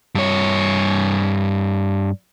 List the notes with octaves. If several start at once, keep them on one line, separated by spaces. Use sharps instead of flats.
G2 C#5